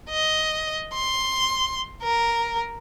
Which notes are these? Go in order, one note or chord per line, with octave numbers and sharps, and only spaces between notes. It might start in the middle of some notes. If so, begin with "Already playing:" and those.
D#5
C6
A#4